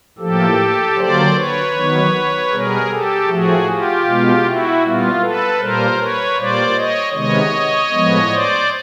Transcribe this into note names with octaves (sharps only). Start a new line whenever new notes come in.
A2 F3 A#3 G4 A4
D3 F#3 A#3 C5 D5
B4 C#5
D#3 F#3 B3
B2 G3 B3 G#4 A#4
G4 A4
A2 F3 A3 F#4 G#4
F4 G4
B2 G#3 B3
E4 F#4
A#2 G3 B3 F4
A4 B4
A#2 G3 A#3 A#4 C5
B4 C#5
A#2 G3 A#3 C5 D5
C#5 D#5
C3 D#3 G#3 B3 C#5 D#5
A2 F3 G#3 B3
C5 D5